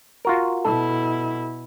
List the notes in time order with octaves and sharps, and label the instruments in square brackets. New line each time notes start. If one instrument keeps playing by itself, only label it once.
[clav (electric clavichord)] F4 F#4 A#4
[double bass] B2 E4 [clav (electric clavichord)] A4